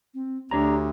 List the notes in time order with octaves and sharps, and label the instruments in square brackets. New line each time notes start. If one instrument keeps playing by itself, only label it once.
[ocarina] C4
[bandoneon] D2 [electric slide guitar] D4 C#5 A#5 [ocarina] G4